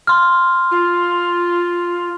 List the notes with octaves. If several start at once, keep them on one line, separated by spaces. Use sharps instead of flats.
C6 F6
F4